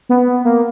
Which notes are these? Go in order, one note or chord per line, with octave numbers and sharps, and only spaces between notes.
B3
A#3